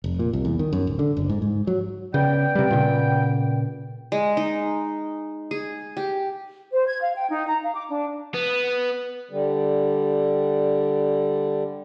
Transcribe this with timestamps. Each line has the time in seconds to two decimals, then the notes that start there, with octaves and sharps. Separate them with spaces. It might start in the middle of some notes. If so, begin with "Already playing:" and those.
0.04 F1
0.19 A#2
0.33 C2
0.45 E2
0.59 D#3
0.73 F#2
0.87 D1
0.99 D3
1.17 F#1
1.29 G#2
1.42 G#2
1.67 F#3
2.14 C#3 B3 D5 G5
2.55 C3 G3
2.71 A#2 C#3
4.12 G#3
4.37 D#4
5.51 G#4
5.97 G4
6.72 C5
6.87 G#6
7.02 F5
7.15 G5
7.30 D#4
7.47 A#5
7.63 F5
7.74 D6
7.89 D4
8.34 B3
9.31 D3 G3